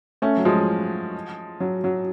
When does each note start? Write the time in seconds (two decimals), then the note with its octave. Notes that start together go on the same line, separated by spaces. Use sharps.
0.22 A3 C#4
0.37 F#3
0.45 F3 G#3
1.60 F#3
1.84 F#3